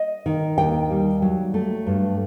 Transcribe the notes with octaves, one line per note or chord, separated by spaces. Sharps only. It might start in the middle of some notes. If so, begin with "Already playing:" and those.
Already playing: D#5
D#3
D#2 G5
G3
F#3
A3
G2